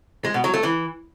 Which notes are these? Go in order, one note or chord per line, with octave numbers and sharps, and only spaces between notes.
G#3
B2
F#3
A3
E3